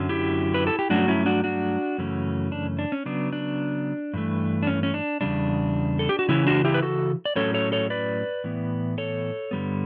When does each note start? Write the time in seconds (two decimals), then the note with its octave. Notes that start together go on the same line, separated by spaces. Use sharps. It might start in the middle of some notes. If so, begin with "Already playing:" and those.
Already playing: F#2 D3 F#3 C#4
0.09 E4 G4
0.54 B4
0.67 A4
0.79 G4
0.90 G2 F#3 A3 C#4 D4 F#4
1.08 C#4 E4
1.26 D4 F#4
1.44 D4 F#4
1.98 F#2 C#3 E3 A3 C#4
2.52 D4
2.79 D4
2.92 C#4
3.06 C#3 F#3 B3 D4
3.33 D4
4.14 G2 E3 A3
4.62 D4
4.67 C#4
4.83 C#4
4.94 D4
5.21 E2 C#3 G3 D4
5.99 A4
6.09 G4
6.19 F#4
6.28 C#3 E3 C#4 E4
6.47 D4 F#4
6.64 E4 G4
6.74 B4
6.82 F#4 A4
7.25 D5
7.36 A2 F#3 C#4 A4 C#5
7.54 A4 C#5
7.72 A4 C#5
7.90 B4 D5
8.44 A2 E3 B3
8.98 A4 C#5
9.51 G2 D3 G3 B3